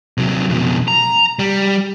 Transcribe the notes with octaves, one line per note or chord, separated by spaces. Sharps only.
C3 F#3
F2 B2
A#5
G3